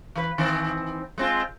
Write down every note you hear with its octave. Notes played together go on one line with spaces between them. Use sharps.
E3 B4
D#3 E3 C4
G#3 C4 F4